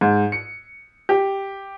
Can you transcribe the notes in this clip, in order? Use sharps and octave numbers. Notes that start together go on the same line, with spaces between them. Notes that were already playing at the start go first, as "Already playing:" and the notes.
G#2
C#7
G4